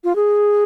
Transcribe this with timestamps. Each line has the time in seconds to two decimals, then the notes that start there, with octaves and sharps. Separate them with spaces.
0.04 F4
0.16 G#4